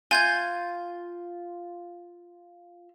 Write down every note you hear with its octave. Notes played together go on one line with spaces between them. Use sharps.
F4 G#5 G6 G#6